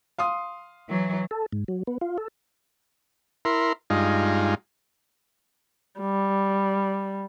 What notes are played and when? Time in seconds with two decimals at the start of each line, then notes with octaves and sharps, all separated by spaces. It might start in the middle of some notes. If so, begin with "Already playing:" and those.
0.18 F5 C6 D#6
0.89 E3 F#3
1.31 A4
1.53 G#2
1.68 F#3
1.87 B3
2.01 F4
2.18 A4
3.45 E4 A#4 C6
3.90 G2 G#3 D#4 F4
6.00 G3